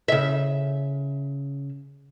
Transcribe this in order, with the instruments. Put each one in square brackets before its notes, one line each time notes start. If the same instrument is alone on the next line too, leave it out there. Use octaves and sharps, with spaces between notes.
[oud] C#3 E5